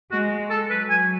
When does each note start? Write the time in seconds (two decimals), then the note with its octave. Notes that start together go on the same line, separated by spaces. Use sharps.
0.11 G#3 F#4
0.50 A4
0.70 F#3 B4
0.90 G#5